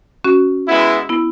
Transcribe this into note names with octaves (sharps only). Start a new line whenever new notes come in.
C#4 F#4
G#3 B3 E4
B3 E4